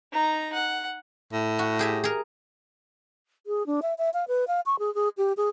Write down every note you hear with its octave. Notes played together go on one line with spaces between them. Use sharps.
D#4 A#5
F#5
A2
F#4
G4 G#4 E5
G#4 A#4
G#4
D4
E5
E5
F5
B4
F5
C#6
G#4
G#4
G4
G#4